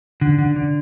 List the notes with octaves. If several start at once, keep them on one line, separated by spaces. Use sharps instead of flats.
D3
D3
D3